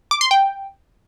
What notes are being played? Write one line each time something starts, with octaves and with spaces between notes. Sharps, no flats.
D6
C6
G5